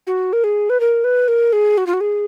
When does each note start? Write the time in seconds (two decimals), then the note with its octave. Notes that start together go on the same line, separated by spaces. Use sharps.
0.07 F#4
0.33 A#4
0.44 G#4
0.70 B4
0.80 A#4
1.04 B4
1.28 A#4
1.53 G#4
1.77 F#4
1.87 F4
1.93 F#4
2.01 G#4